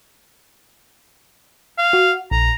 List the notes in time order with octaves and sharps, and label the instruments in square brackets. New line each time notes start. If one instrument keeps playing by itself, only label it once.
[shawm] F5
[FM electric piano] F#4
[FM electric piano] A#1 [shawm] A#5